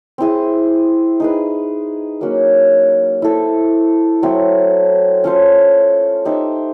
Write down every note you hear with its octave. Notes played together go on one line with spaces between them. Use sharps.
C4 E4 G#4
D#4 G#4 B4
F#3 A#3 C#4 F#4
E4 A4 C5
F#3 A3 C4
C#4 F4 A4 C5
D#4 G4 C5 E5